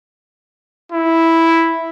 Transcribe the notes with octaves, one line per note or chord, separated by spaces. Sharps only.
E4